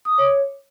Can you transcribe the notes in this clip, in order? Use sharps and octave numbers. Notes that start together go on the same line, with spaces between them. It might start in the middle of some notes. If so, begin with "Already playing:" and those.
D#6
D6
C#5